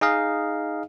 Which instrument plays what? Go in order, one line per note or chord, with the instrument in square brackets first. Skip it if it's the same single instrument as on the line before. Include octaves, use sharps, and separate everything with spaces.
[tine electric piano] D#4 G#4 D#5 F5